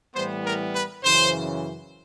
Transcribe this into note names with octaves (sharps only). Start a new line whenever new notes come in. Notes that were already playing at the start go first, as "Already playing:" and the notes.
A2 E3 G3 B3 C5
A#4
B4
F#2 C#3 E3 C5